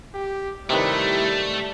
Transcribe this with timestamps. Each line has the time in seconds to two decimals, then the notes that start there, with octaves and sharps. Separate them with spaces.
0.14 G4
0.70 C3 D#3 G3 A3 E4 B4